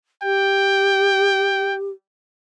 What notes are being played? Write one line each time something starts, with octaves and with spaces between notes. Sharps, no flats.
G4 G5